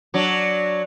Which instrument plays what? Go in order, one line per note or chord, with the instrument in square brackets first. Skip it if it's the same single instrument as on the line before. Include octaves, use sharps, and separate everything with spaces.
[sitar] F#3 D4